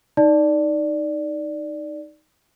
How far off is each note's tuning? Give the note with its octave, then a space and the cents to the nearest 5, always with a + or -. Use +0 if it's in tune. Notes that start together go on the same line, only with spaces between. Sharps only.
D#4 +0 D5 +0